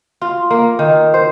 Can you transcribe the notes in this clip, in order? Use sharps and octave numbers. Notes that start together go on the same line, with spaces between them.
F4
A#3
D#3
C5